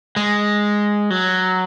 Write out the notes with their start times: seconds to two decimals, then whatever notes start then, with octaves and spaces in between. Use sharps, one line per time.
0.16 G#3
1.10 F#3